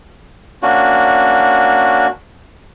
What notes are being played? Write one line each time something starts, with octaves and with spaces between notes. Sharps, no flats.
A#3 C#4 D4 F#4